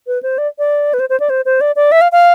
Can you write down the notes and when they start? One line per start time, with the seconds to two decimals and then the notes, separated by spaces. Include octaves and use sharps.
0.07 B4
0.23 C5
0.38 D5
0.58 D5
0.94 B4
0.99 C5
1.09 C5
1.20 D5
1.29 C5
1.45 C5
1.61 D5
1.76 D5
1.92 E5
2.01 F5
2.12 F5